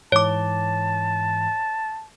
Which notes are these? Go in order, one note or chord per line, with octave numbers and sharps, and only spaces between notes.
G#2 E3 C#5 A5 D6